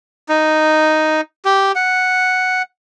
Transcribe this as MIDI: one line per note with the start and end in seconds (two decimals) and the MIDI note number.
0.29 1.21 63
1.45 1.72 67
1.75 2.62 78